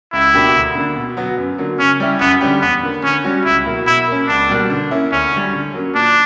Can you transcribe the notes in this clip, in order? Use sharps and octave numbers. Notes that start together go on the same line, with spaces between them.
C#2 E4
B2 A#3 D4 G4
D2
D3 A#3 D4
B2
F#3 B3 F#4
F#2
D3 F#3 A#3
C#3 C#4
G3 C#4 E4 G4
F#2 B3
D3 G3 C#4 G4
E2 B3
D3 A#3
D3 C#4
G3 C#4 F#4
C#2 E4
B2 F#3 A#3 E4
B2 E4
A#3 C#4
C#2 D4
B2 G3 A#3
D3
A#3 C#4 E4
D2 C#4
D3 G3
D3
F#3 A#3 C#4
A#2 D4